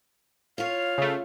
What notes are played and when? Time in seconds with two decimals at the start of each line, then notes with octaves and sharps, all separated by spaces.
0.58 F4 C#5 F5
0.98 C#3 A3